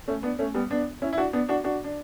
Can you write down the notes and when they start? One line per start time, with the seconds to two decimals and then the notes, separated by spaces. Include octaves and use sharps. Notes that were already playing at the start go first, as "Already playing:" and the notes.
0.08 A3 C#4
0.23 B3 D4
0.39 A3 C#4
0.54 G3 B3
0.71 B3 D4
1.02 C#4 E4
1.13 E4
1.18 D4 F#4
1.33 B3 D4
1.49 D4 F#4
1.64 D4 F#4
1.84 D4